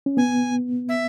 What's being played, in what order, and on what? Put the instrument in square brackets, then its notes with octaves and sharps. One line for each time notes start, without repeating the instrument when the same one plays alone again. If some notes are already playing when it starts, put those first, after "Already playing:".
[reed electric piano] C#4
[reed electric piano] B3 [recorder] G#5
[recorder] E5